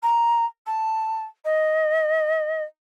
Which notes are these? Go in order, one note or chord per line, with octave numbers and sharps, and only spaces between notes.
A#5
A5
D#5